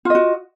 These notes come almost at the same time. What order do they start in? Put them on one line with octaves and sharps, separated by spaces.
F4 D#5 F#4